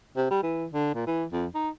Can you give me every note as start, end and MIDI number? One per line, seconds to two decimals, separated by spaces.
0.17 0.26 48
0.31 0.42 55
0.43 0.67 52
0.73 0.93 50
0.95 1.04 46
1.07 1.25 52
1.32 1.47 41
1.55 1.69 63